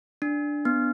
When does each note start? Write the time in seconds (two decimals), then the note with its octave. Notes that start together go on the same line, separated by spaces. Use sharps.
0.22 D4
0.65 B3